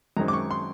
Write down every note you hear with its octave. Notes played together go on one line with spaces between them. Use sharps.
F#2 D#3 G#3 C4 A#5
D6
C#6
C6